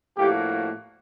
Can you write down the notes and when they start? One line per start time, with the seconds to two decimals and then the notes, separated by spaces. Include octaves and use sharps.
0.18 A2 F3 A#3 D4 F#4 G4